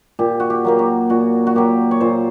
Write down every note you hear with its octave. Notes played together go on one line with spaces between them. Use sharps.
A#2 G4
F#4
G4
F#3 A#3 G4
F#4
A#2 F#4
F#4
F#3 A#3 G4
C#5
A#2 C5